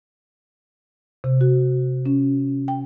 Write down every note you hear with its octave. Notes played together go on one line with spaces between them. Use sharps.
C3
F#4
C#4
G5